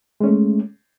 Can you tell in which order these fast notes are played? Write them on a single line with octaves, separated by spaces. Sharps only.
G#3 C#4 A3